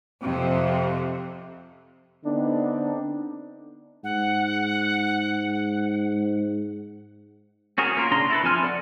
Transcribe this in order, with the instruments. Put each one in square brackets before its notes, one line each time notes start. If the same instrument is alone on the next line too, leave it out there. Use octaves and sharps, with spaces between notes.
[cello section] F2 C3
[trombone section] D3 B3 C4 D4 D#4
[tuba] G#2 [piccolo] F#5
[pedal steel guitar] C#4 F#4 G#4 A#4
A#3 C#4 F4 A#4
C#3 D4 A#5 C6
E4 A4 B4
F3 C4 G#5 F6
A4 D5 F#5